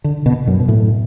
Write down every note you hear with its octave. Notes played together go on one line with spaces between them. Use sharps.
D3
B2
F#2
B2
A2